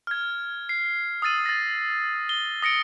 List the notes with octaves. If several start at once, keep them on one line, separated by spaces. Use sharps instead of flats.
F6 G#6
C7
D#6 E6 A6 D#7
A6 A#6
G7
D#6 A#6 C#7 D7